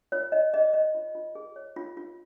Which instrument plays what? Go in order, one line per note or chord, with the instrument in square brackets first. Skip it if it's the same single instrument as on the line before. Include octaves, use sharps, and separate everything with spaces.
[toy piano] F4 C#5
F4 D#5
G#4 D#5
C#5 D#5
F4
F4
G#4
C#5
F4
F4